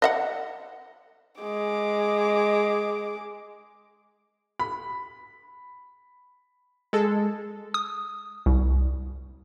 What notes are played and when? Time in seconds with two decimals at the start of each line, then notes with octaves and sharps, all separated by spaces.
0.02 D#5 E5 F#5
1.41 G#3 D6
4.59 B5
6.93 G#3 A4
7.74 D#6
8.46 C2